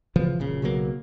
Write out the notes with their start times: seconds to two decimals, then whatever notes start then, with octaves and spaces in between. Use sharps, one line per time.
0.16 C#3 E3 F3
0.39 F#1 A#2 C#3
0.62 B1 C#3 F#3 A#3